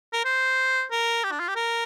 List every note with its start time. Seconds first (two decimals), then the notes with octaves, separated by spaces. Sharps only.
0.13 A#4
0.25 C5
0.91 A#4
1.24 G4
1.32 D4
1.40 F4
1.48 G4
1.56 A#4